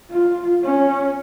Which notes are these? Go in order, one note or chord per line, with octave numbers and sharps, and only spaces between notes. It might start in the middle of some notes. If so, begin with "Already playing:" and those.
F4
C#4